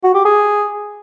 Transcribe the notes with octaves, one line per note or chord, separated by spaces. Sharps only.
F#4
G4
G#4